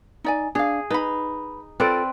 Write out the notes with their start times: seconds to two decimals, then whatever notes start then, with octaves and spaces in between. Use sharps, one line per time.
0.24 D#4 D5 G#5
0.55 D4 G#4 F5
0.90 D#4 B4 B5
1.80 C4 F4 A4 B4 D5